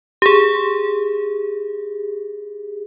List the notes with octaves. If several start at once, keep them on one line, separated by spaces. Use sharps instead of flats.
G4 G#4